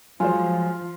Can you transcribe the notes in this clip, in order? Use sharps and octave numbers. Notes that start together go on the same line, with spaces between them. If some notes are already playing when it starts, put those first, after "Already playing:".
F3 F#3 G#3 F4 C5 G#5